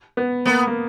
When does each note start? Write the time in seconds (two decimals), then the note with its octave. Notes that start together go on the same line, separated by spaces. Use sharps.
0.17 B3
0.46 A#3 B3
0.67 A#3